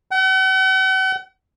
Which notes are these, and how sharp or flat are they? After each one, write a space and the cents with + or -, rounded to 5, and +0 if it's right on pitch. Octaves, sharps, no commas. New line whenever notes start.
F#5 +45